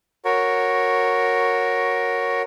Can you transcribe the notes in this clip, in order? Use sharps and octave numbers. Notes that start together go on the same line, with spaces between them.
F#4 A#4 C#5